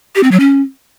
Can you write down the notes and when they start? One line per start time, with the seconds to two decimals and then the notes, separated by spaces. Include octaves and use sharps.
0.15 G4
0.23 C4
0.32 F#3
0.40 C#4